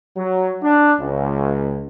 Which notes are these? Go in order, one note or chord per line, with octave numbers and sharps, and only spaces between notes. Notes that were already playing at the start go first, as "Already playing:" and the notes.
F#3
D4
C#2